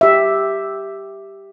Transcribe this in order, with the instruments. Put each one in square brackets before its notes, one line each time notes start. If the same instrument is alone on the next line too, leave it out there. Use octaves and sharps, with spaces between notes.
[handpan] G4 E5